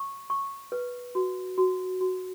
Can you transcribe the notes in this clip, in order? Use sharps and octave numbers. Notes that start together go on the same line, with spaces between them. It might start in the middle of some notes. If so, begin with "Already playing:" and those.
Already playing: C#6
C#6
B4
F#4
F#4
F#4